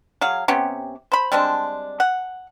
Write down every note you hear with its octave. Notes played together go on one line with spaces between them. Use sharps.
F#3 G#4 F5
C3 B3 C#4 G4
C5 B5
G3 G#3 C4 D4
F#5